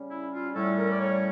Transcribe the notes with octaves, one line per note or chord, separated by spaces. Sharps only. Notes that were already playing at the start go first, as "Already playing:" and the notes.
Already playing: C#3 G3 C#4
E4
F4
A2 G3 C#4 A4
A#4
D5
C#5